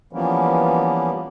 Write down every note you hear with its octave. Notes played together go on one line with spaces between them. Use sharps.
E3 F3 G3 A#3 B3 C#4